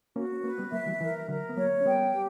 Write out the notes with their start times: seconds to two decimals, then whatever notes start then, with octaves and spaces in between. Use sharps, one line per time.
0.15 A#3 C#4 F#4
0.44 A#3 C#4 B4
0.58 G3 B3
0.72 F#3 A#3 E5
0.86 E3 G3
1.01 E3 A#4
1.28 D3 F#3 A#4
1.49 B3
1.57 F#3 A#3 C#5
1.81 C#4
1.86 G3 B3 G5
2.13 G4